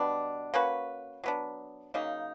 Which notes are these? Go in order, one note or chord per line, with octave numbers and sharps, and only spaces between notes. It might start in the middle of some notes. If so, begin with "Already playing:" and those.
Already playing: B2 G3 B3 D4
A#3 C#4 F#4 B4
F#3 B3 D4
C#3 F#3 A#3 D#4